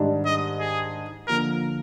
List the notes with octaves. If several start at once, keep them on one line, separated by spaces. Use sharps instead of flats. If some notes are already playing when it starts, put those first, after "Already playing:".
Already playing: G#2 D#3 G3 D4
D#5
G#4
D3 F3 A#3 A#4